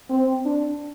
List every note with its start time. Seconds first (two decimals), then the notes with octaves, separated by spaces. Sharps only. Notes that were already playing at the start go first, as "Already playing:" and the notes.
0.10 C4
0.45 D4